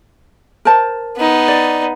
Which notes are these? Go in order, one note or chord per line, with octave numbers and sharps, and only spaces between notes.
A#4 C5 A5
B3 D#4
D5